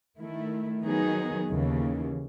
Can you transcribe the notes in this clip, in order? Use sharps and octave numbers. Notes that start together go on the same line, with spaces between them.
D#3 A3 E4
D#3 F#3 B3 D#4 G#4
D#2 C#3 E3